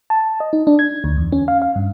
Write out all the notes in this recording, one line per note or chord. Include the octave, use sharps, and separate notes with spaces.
A5
D#5
D#4
D4
G#6
D2
E2
C#4
F5
F5
G2